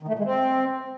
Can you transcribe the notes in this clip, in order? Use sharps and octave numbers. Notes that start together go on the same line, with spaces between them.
D#3
A3
A#2
G#3
C4